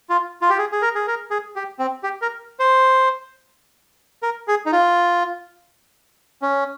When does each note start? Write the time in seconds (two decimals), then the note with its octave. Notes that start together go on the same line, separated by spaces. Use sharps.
0.10 F4
0.42 F4
0.50 G4
0.58 G#4
0.72 G#4
0.82 A#4
0.95 G#4
1.07 A#4
1.31 G#4
1.56 G4
1.79 C4
2.03 G4
2.22 A#4
2.59 C5
4.23 A#4
4.48 G#4
4.66 D#4
4.72 F4
6.42 C#4